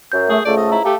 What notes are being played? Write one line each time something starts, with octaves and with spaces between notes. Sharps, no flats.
F#2 G6
A3 G#4
C#2 G#2 A3 A4 D5
D#5
E4 A#5
A3 G4 F5 A5